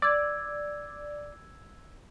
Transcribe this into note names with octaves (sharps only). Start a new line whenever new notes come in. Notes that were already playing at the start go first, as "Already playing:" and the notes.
D5 E6 G#6